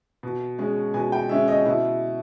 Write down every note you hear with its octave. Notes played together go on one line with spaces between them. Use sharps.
B2
G#3 C#4
B2 G#5
G5
G#3 C#4 E5
D#5
B2 E4